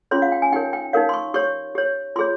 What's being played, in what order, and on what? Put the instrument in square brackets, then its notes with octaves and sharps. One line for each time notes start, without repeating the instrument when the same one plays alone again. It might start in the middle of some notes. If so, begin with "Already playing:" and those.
[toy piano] C#4 F4 G#4 C#5 C6
F5
G5
G#5
D#4 G4 A#4 C#5 G5
G5
D#4 G4 A#4 C#5 F5
C6
C#6
G4 C#5 C#6
G4 C#5
F4 G#4 C#5 C6